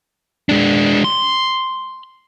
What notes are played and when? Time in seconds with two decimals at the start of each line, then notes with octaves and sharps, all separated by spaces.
0.49 G#3 D4
1.04 C6